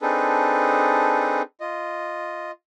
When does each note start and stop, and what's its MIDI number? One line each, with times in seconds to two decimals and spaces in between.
0.01 1.42 60
0.01 1.42 62
0.01 1.42 63
0.01 1.42 68
0.01 1.42 69
0.01 1.42 71
1.61 2.51 65
1.61 2.51 75